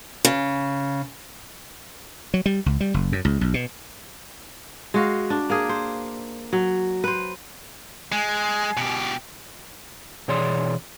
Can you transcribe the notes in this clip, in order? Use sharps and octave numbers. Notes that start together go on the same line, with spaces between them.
C#3
F#3
G3
C#2
G3
F#1
F#2
C#2
B1
B2
G#3 F#4 F5
D4
A#3 G#4
C5
F#3
B4 C5
G#3 G#5
B2 G4
B2 E3 G#4 C#5 D5 C6